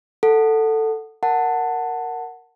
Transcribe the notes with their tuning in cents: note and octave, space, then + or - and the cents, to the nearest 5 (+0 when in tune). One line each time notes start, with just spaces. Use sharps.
A4 +10 F#5 +0
A#4 +0 F#5 +0 A5 +15